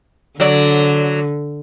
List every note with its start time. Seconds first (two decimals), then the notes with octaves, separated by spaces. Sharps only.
0.40 D3 F#3 D5